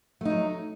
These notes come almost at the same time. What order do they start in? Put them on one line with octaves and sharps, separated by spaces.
A3 D#4 F#3